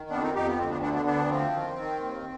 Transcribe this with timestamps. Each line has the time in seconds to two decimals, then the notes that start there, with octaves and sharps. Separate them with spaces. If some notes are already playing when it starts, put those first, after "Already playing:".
Already playing: D#3
0.10 F2 B3 D4
0.22 C4 D#4
0.34 F2 D#4 G4
0.46 B3
0.58 D2 C4
0.70 B3 D4
0.81 D3 B3 D4
0.93 B3 D4
1.05 D2 B3 D4
1.29 F3 C4
1.53 D#3
1.76 D#3
2.00 D#2